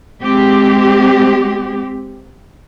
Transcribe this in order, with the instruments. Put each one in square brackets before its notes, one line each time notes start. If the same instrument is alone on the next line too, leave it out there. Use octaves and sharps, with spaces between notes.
[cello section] G#3 C4 G4